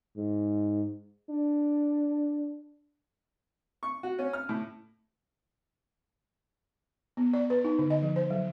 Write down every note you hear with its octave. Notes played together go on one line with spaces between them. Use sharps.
G#2
D4
C#6
F#4
C#4
F6
A2
B3
D5
B4
D#4
D3
D#5
F3
C5
F#3